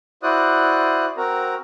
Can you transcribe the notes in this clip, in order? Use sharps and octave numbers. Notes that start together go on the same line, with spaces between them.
E4 F#4 C5 D5 D#6 F#6
C4 F#4 A#4 A#5